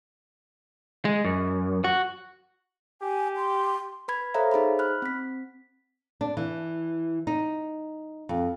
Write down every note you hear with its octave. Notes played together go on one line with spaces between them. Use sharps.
G#3
F#2
F#4
G4 G#5
C6
B4 B5 G#6
A4 C5 C#5 E5 F5 A#5
D#4 G#4 C5 B5
B5 F6 F#6
C4 B6
D4
E3
D#4
F2